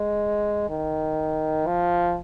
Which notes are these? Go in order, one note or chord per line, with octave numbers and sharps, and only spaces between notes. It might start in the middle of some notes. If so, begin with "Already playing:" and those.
Already playing: G#3
D#3
F3